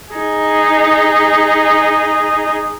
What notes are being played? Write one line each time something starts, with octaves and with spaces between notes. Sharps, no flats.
D#4 G#4